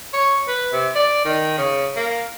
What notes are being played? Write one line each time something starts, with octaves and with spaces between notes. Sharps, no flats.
C#5
B4
C3
D5
D#3
C#3
A#3